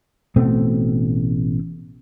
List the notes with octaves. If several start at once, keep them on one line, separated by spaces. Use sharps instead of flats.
A1 B2 A3 C4